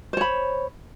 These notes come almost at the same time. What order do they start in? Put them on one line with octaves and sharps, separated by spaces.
C5 C#5 B5